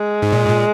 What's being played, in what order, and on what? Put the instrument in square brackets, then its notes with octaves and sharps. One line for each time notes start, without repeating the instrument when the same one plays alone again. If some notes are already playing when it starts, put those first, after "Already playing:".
Already playing: [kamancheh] G#3
[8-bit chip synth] G#2
A#2
G#2
A#2